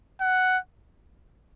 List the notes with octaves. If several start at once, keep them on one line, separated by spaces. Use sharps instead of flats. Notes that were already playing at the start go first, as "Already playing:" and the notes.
F#5